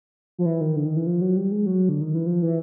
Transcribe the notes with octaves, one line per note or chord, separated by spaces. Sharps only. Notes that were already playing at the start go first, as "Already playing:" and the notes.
F3
E3
D#3
D3
D#3
E3
F3
F#3
G3
G#3
F#3
D3
D#3
E3
F3
E3